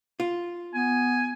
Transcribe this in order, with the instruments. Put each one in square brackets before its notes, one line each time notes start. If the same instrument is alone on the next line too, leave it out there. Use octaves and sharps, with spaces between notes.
[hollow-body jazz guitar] F4
[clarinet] B3 [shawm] G#5